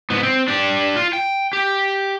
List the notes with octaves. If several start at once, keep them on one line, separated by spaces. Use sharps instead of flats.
G#2 B3
C4
D4 G4
F4
G5
G4